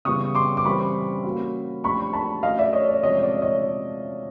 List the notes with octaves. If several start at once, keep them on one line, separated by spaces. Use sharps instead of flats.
C#3 E3 G3 B3 E4 C#6 D#6
C6 D6
D6
E3 G3 C4 E4 B5 C#6
A#3 C#4 F#4
F3 A3 D4 G4 B5 C#6
A5 B5
F#3 A3 C#4 E4 D#5 F5
D5 E5
C#5 D#5
D5
C3 F3 G#3 C#5 D#5
D5
C#5 D#5